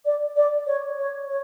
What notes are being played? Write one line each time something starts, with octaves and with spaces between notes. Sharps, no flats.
D5
D5
C#5
C#5
C#5